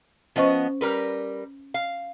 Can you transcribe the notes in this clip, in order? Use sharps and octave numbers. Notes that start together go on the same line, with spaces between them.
F3 B3 C#4 C5 D#5 C#6
G3 A#4 B4
F5